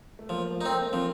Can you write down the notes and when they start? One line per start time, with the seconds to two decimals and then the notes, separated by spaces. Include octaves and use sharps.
0.19 A3
0.29 F3 A#3
0.51 A3
0.61 C4 D#4
0.71 A#3
0.93 F3 C4